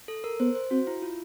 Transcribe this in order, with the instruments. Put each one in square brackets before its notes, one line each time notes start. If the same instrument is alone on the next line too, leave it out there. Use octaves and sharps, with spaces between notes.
[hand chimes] A4
A#4
[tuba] B3 [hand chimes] C5
[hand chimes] C5
[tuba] C4 [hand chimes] F#4
[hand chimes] E4
F4